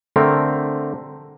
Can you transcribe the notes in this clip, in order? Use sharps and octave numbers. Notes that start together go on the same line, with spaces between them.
D3 A3 C4 A#4